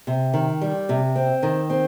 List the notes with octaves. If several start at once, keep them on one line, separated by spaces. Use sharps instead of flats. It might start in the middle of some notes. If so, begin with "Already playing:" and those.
C3
D#3
G3
C3
C4
D#3
C4